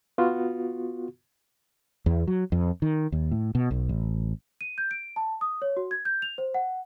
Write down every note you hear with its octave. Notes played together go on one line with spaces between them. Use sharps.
B3 F4 F#4
E2
F#3
F2
D#3
D#2
A2
B2
B1
A1
D#7
G6
D7
A5
D#6
C#5
F#4
G#6
G6
F7
C5
F#5